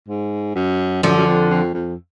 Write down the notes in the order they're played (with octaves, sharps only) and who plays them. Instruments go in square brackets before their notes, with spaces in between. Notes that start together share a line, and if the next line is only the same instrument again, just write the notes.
[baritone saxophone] G#2
F#2
[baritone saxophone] F#2 [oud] D3 F3
[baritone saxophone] F#2
F2
F2
F2